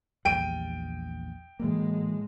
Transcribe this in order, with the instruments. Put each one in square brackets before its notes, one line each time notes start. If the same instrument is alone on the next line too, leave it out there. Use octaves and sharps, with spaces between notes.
[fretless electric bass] A#1 E2 G3 [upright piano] G5 D7 D#7
[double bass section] A2 G#3 [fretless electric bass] E3 F#3 A#3